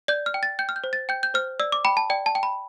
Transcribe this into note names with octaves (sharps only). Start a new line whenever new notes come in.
D5 G6
F6
G5
A6
G5 G6
F6
G6
C5
A6
G5 G6
G6
C5 F6
D5 E6
D6
G5 B5
A5
D5 G5
A5
G5
B5